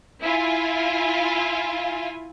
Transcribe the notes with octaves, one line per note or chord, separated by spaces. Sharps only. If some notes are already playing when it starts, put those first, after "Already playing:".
E4 F4 G#5